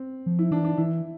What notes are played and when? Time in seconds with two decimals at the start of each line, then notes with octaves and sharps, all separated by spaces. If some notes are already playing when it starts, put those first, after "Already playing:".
Already playing: C4
0.26 F3
0.39 E4
0.51 E3 D4
0.65 D4
0.78 E3 E4